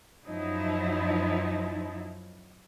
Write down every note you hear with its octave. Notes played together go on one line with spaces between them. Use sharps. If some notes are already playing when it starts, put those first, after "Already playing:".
F#2 F3 F#3 D#4 E4